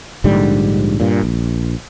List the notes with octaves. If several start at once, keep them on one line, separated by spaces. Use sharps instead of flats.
A#1 G#2 D3 G3
G2 A#2
A#1